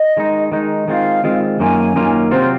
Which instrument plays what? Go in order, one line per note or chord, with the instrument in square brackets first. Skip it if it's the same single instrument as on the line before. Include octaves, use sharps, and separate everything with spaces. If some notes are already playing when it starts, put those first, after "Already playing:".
Already playing: [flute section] D#5
[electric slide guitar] D#3 G#3 D#4
D#3 G#3 D#4
[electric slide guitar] D#3 G#3 C4 F4 [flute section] F5
[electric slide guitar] D#3 G#3 C4 F4
[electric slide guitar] F#2 D#3 A#3 C#4 F4 [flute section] G#5
[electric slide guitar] F#2 D#3 A#3 C#4 F4
[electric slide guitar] C3 F#3 C4 F4 [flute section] C5